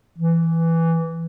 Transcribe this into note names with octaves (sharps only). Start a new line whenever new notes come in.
E3